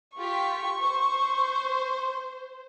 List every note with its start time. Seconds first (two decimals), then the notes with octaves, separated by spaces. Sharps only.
0.18 F4 G4 C#6 B6
0.82 C5